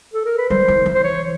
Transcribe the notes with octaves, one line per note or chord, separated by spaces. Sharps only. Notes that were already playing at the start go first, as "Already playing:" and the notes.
A4
A#4
B4
G3 C5
E3
E3
C5
C#5